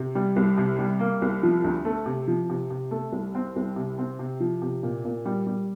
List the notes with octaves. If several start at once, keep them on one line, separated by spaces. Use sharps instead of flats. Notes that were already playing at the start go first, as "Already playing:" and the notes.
Already playing: C3
G3
C2
C3
G3
A#3
C2
F3
D2
A3
C3
F3
C3
C3
A3
C2
C4
C2
C3
C4
C3
F3
C3
A#2
A#2
G3
G3